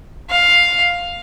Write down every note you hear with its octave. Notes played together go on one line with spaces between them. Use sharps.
F5